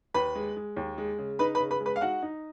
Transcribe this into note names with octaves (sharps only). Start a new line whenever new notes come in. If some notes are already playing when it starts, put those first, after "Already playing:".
D#2 B4 B5
G#3
G#3
D#2
G#3
C#3
D#4 B4 B5
B4 B5
C#3
B4 B5
G#3
B4 B5
F5
D#4 F#4 F#5
D#4